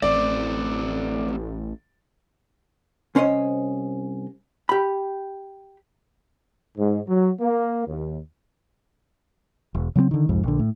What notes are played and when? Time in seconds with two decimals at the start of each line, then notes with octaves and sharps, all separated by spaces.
0.02 A1 A3 C4 D5
3.15 C2 C#4 C5 C#5 D#5
4.69 G4 B5
6.77 G#2
7.08 F#3
7.40 A#3
7.86 D#2
9.75 E1
9.96 C#3 F#3 A#3 C4
10.11 D3 D#3
10.29 C2 F2 G#2
10.43 A#1 D3
10.59 A2